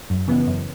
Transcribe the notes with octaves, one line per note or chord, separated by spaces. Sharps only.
F#2
C#3 E3 B3
F#2